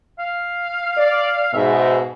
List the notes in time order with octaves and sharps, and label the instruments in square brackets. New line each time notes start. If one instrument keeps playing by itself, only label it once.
[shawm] F5
[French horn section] D5
[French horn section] G#2 B2 [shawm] E5